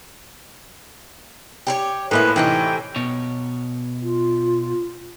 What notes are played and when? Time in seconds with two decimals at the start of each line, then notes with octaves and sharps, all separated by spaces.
1.67 G4 A#4 C#5
2.11 A2 F3 G#3 A#3 B3 E4 B4
2.36 A2 C3 E3 C#4 D#4 G5
2.96 B2 C#5
4.02 F4